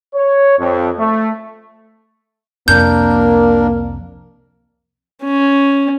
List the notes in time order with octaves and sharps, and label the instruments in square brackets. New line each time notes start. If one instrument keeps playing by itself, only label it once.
[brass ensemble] C#5
F2
A3
[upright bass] C2 F2 [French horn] A#3 [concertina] D4 A#4 [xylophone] G6
[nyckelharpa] C#4